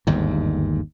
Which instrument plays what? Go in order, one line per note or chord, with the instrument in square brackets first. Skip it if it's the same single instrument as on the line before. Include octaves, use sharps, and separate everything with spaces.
[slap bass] G1 D#2 G#2